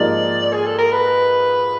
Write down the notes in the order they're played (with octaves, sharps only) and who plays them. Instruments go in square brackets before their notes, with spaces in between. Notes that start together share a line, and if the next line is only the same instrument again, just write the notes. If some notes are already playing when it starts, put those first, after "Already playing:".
Already playing: [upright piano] G#2 F3 A#3 D#4 G4 [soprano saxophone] D5
[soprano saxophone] G#4
A4
A#4
B4